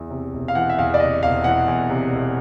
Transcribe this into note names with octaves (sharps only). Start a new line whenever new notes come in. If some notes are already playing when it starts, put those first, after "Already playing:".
Already playing: E2 E3
C3
E1
F5
E3 F#5
E5
E2 F5
D5
C3 D#5
E1 F5
E3 F#5
E2
C3
E1